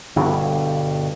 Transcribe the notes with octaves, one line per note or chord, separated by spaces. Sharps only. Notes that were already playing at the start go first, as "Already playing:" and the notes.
G1 G2 B2